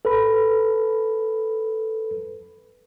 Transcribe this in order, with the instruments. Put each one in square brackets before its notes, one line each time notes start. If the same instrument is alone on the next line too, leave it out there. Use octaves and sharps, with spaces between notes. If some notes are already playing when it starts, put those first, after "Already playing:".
[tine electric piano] A4 B4 B5